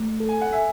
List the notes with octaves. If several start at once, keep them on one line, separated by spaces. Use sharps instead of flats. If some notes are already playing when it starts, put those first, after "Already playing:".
Already playing: A3
A4
G#5
F#5
E5 G#5